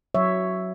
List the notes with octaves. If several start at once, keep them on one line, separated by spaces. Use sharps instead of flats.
F#3 C#5 E5